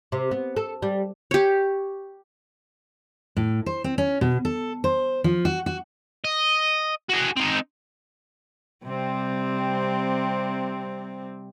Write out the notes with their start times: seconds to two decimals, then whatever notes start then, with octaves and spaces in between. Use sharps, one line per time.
0.12 C3
0.31 B3
0.56 A4
0.82 G3
1.31 G4 C#5
3.37 A2
3.66 C5
3.84 C4
3.98 C#4
4.21 B2
4.45 A4
4.84 C5
5.24 F3
5.45 F#4
5.66 F#4
6.24 D#5
7.09 F#4 G#4
7.36 C4 D#4
8.84 C3 G3 C4